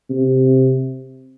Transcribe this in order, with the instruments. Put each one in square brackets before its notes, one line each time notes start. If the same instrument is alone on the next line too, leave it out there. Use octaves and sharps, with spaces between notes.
[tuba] C3